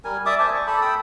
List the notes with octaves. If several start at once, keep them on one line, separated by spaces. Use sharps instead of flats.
G3 A#4 G#5
D5 E5 D6 D#6
C5 E5 G#5 A5
C#6
A4 A5 B5
G5 B5 D#6 E6